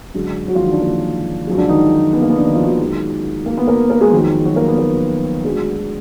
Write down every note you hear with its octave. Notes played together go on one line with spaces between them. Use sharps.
F#2 D3 G#3
F#3 F#4
F3 F4
D#3 D#4
D3 D4
A#3
F#2 F3 G#3
D3 D4
D#3 D#4
B3
A#3
B3
D3 D4
D#3 D#4
F3 F4
F#3 F#4
D#3 D#4
F#2 F3 G#3
A#3
B3
A#3 A#4
A#3 A#4
G#3 G#4
F2 D#3 F#3
F#3 F#4
A#3 A#4
B3 B4
A#3 A#4
D2 D3 F#3 G#3 G#4